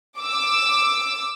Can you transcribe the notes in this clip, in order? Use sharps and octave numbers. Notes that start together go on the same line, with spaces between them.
D6 E6